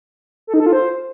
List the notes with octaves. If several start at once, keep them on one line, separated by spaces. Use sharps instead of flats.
A4
D#4
A4
F4
C5